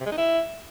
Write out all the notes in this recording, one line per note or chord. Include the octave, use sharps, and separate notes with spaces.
C3
G#3
D#4
E4